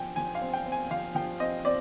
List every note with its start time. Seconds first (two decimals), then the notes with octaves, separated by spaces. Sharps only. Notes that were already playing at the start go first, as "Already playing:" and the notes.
Already playing: F3 G5 G#5
0.16 F3 G#5
0.35 F5
0.41 C4
0.53 G5
0.66 C4
0.72 G#5
0.91 F3 F5
1.15 F3 G5
1.40 C4 D#5
1.65 C4 D5